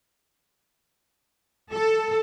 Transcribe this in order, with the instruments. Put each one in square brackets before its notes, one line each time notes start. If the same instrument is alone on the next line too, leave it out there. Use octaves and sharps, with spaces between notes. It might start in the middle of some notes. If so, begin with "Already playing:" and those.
[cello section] A4